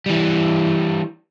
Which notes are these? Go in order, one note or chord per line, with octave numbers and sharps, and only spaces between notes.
E3 G3